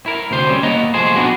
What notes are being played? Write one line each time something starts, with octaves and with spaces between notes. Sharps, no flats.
E4 A#4
D2 C3 C5
G3 C4 C#4
A#3 B3 D#5 A#5
C2 F3 A3 G#4 C5
A#2 B3 D4 F#4 G#4